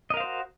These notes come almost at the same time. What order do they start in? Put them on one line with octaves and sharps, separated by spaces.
D#5 A#4 F5 C5 F#4